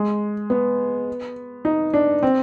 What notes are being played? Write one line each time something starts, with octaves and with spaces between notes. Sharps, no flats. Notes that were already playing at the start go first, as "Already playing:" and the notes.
Already playing: G#3
B3
D#4
D4
C4